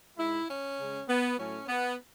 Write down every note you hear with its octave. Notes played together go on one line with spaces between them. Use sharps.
G#2 G#3 E4
C#4
C#3 G#3
B3
A2 F#3 A3 C#4
B3